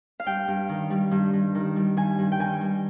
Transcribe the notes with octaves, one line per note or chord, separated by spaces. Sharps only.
F5
G2 G5
G2
D#3
G3
G2
G2
D#3
G3
G2 G#5
G2
G5
D#3 G#5
G3